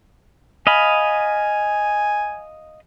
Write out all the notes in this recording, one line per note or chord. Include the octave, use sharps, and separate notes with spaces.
D#5 F5 G#5 B5